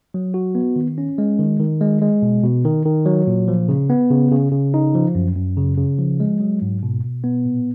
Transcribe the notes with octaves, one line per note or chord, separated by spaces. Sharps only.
F#3
F#4
B3
D#3
C#4
G#3
D#3
D#3
G#3
G#3
B2
B2
D#3
D#3
F#3
A#2
F3
C#3
B3
C#3
C#3
C#3
D#4
F3
F#2
F#2
C#3
C#3
F3
G#3
F#3
G#2
B2
B2
B3
A#2